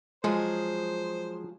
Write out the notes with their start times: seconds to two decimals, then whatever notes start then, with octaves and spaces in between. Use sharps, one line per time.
0.24 F3 F#3 G#3 G#4 C5